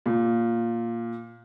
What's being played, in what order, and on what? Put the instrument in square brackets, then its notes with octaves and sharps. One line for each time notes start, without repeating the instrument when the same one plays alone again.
[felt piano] A#2